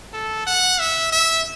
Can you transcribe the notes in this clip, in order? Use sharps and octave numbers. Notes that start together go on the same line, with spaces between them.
A4
F#5
E5
E5